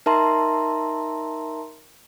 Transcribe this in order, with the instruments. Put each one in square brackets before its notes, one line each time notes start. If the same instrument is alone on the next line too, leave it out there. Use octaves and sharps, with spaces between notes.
[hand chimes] D#4 A#4 E5 A5 A#5 C6